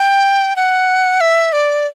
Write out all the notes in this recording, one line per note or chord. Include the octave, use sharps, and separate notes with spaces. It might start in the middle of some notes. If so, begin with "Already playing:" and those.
Already playing: G5
F#5
E5
D5